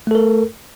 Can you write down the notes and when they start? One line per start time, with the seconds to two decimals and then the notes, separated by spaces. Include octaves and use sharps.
0.07 A3
0.11 A4
0.15 A#4